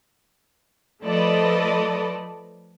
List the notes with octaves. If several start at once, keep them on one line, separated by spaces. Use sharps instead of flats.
F3 A3 A4 B4 D5 D#5